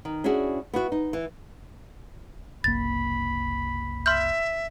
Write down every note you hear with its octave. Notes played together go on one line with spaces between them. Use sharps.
D#3
C#4 D4 E4 F#4 G#4
B3 E4 F#4
D#4
E3
F#1 C2 A#3 B5 A6
E5 C6 F6 G6